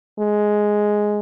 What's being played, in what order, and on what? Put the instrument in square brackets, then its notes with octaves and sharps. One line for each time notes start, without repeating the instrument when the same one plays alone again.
[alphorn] G#3